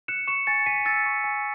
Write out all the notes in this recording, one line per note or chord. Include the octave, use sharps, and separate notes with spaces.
F#6 C#7 E7
C#6 C#7 E7
G#5 A6 C#7
G#5 B6 D#7
E6 A6 C#7
C#6
G#5